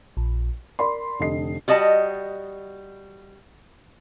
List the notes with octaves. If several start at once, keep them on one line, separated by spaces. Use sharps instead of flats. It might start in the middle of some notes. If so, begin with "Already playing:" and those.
A#1
A#4 D5 B5 C6
F1 D3 D#5 C7
G3 F#4 D#5 A5